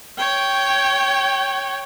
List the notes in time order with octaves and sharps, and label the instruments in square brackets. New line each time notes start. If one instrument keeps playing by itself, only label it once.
[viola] C#5 G5